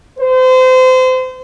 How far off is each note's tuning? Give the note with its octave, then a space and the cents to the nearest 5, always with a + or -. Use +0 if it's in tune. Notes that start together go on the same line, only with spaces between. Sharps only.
C5 -30